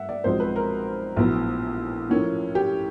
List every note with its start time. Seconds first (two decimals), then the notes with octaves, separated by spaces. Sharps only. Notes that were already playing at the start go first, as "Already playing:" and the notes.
Already playing: G2 A3 E5 F#5
0.09 D5
0.24 B1 A#2 F3 G#3 C4 C5
0.40 B4
0.56 A#4
1.17 A#1 A2 F#3 B3
2.09 A2 F3 A#3 C#4
2.55 G4